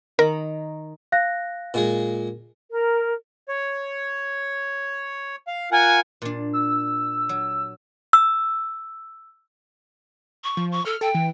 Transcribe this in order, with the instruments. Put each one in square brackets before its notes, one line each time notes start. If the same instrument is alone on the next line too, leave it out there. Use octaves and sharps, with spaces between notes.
[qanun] D#3 A#5 B5 [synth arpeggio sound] A#4
[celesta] F5 F#6 A#6
[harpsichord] A#2 G#3 G#4
[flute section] A#4
[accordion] C#5
F5
[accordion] F4 A#4 F#5 [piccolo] G#5
[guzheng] A#2 D4
[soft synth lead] E6
[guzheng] F#3
[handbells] E6
[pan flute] C#6
[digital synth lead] F3
[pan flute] C#6
[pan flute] A4 [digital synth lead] F6
[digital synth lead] A4 [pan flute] G5
[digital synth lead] E3